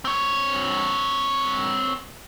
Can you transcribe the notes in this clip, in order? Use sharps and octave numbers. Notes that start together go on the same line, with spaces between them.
C4 C#5